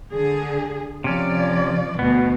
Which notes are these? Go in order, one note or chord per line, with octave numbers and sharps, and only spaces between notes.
D3 G#4
C3 F3 C#4 D5
D2 B2 B3